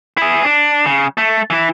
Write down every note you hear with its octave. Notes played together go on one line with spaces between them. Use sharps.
E4 G#4
D4
C#3
A3
E3 E4